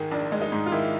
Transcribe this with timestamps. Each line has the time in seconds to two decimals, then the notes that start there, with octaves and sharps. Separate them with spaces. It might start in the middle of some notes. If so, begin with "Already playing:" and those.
Already playing: G#2 D#3 G#3
0.11 A#1 D4
0.32 G#3
0.42 D#4
0.52 G#2
0.66 F4
0.72 D#3 E4